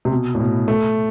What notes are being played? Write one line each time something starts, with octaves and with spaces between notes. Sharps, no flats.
C3
B2
A2
B2
A3